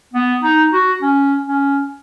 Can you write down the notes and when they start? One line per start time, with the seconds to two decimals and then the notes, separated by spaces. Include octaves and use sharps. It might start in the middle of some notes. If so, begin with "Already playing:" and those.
0.14 B3
0.42 D#4
0.73 F#4
1.02 C#4
1.47 C#4